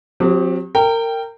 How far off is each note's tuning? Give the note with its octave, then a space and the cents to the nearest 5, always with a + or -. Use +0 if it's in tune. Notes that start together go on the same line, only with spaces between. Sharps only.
F#3 -40 C4 +0 G4 +0
A#4 -25 G5 +0